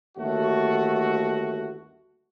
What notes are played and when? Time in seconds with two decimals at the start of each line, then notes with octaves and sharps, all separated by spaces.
0.18 G1 D#2 A3 F#4